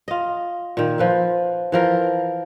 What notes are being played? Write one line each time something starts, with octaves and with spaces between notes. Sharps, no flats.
F4 D#5
A#2 D#3
F3 B4 E5
E3 F3 A#4